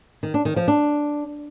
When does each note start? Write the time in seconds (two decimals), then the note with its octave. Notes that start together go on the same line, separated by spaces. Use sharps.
0.23 D#3
0.34 D4
0.45 D#3
0.56 F3
0.68 D4